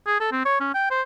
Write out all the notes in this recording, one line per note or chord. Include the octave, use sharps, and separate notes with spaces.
G#4
A4
C4
C#5
C#4
G5
C5